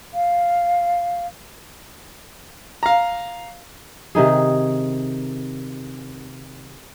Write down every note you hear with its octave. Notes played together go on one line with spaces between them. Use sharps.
F5
F5 A#5
C3 D#3 D#4 G#4